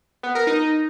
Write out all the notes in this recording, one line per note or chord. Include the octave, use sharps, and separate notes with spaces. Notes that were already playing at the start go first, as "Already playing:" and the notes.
B3
A#4
D#4